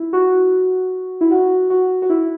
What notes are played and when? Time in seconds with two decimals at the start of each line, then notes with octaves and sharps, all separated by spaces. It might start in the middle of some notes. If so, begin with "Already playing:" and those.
Already playing: E4
0.13 F#4
1.21 E4
1.31 F#4
1.70 F#4
2.02 F#4
2.10 E4